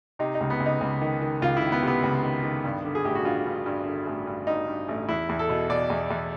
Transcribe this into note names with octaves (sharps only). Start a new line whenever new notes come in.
C3 D#4
D#4
C#2
B3
C#2
D#4
C#2
D#3
D#3
C#2 F4
E4
D#3
B3
C3 B3
C#2
D#3
D#3
G2
D3
G#4
A1 G4
F#4
G2 F4
G2
G2
D3
A1
G2
G2 D#4
G2
A1
E2 E4
E2
A4
B2
B2 D5
E2
E2